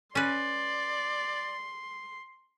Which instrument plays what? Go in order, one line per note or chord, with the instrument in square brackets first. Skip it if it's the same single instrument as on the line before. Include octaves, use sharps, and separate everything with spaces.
[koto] C#4 B4 [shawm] D5 [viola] C6